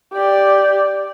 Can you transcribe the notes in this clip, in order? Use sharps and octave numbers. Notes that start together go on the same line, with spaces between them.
G4 D5